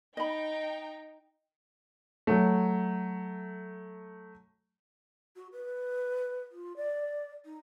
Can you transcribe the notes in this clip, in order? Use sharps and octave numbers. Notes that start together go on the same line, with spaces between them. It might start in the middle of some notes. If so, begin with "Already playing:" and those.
D#4 D#5 G5 B5
F#3 A3
F#4
B4
F4
D5
D#4